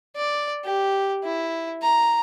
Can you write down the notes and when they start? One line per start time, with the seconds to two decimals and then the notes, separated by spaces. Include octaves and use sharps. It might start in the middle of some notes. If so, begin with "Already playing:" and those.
0.16 D5
0.65 G4
1.24 E4
1.82 A#5